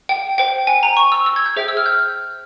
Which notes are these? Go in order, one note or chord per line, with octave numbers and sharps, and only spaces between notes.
G5
C5 G5
G#5
A#5
C#6
E6
E6
G#6
G6
G#4 C5 E5 G5
E6
F6
G6